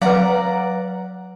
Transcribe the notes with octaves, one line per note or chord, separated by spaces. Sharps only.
F#3 B4 D5 F5 F#5 A#5